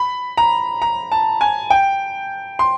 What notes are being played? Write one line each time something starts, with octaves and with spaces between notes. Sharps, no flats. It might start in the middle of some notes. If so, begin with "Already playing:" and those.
Already playing: B5
A#5
A#5
A5
G#5
G5
C6